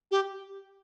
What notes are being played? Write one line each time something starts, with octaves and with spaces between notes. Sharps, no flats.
G4